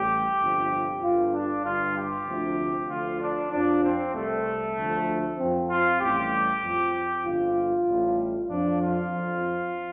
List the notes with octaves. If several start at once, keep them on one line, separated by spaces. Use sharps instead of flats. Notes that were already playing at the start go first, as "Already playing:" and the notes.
Already playing: A1 A2 G3 G4
G1 F2 C3 F3
G1 G2 D3 F4
D4
G1 G2 G3 F4
G4
D2 C3 F3
D2 D3 F3 F4
D4
F2 F3 D4
C4
C2 C3 G3 A3
D2 D3 F3
F2 F3 C4
F4
A1 A2 G3 G4
F2 F3
G1 F2 F3 F4
A1 A2 G3
F2 F3 D4
F4
F2 F3